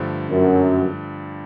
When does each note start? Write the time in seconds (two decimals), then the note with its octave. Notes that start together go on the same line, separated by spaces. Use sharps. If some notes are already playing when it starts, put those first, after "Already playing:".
Already playing: G2 D3 F3 A3
0.30 F#2